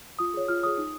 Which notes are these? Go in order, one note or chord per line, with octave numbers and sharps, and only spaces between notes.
F4 D#6
G#4 C#5
F4 F6
G#4 C#5 D#6
D#4